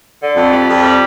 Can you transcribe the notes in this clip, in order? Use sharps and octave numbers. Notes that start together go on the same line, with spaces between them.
D3
F2
G3
F2
G3